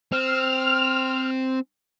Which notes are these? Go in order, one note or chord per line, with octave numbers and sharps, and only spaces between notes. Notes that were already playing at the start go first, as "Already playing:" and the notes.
C4 F6